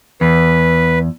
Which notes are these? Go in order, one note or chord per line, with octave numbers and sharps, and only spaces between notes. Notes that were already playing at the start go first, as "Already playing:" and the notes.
E2 B4